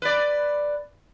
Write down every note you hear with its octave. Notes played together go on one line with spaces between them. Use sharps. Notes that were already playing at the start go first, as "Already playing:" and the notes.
B4 D5